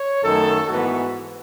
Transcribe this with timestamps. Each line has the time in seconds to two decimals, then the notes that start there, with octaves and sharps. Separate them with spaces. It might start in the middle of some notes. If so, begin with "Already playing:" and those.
Already playing: C#5
0.23 F#2 D#3 A3 A4
0.68 G#2 E3 B3 F#4